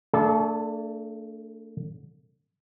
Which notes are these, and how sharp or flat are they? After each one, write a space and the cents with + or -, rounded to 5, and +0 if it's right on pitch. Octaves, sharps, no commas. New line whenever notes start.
A3 +40 D4 +0 A4 -30